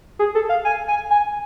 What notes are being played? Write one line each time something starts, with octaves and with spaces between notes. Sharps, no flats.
G#4
A4
F5
G#5
G#5
G#5